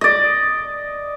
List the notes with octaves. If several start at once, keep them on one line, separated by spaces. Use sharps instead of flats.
D5 D#5